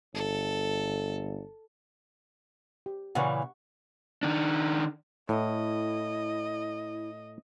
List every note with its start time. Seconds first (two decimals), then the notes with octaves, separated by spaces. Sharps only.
0.14 G1 A4
2.86 G4
3.15 A#2 C#3 E3 F#5 C#6
4.23 D#3 D4
5.29 A2 E4 D#5